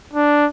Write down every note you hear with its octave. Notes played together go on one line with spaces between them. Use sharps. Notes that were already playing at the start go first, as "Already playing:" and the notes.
D4